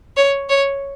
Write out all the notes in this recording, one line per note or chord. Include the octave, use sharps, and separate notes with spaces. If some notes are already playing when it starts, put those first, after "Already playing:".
C#5
C#5